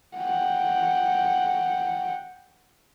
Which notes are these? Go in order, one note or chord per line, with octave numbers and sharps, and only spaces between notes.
F#5 G5